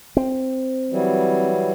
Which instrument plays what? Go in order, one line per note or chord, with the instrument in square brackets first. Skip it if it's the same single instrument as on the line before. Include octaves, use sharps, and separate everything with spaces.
[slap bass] C4
[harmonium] E3 F#3 G3